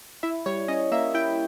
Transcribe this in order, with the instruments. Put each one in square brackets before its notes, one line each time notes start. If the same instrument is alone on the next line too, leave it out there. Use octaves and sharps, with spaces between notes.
[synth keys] E4 E5
G3 C#5
C#4 D#5
A#3 E5
E4 G5